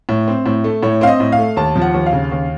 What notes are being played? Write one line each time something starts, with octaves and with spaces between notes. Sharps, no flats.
A2
C4
A2
A3
A2 C#5
C4 F5
D#5
A2
F5
A3
D#2 A5
F3
F#5
D#2
F5
C#3
D#2